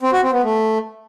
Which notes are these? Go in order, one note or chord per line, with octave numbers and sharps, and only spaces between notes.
C4
F#4
C4
B3
A3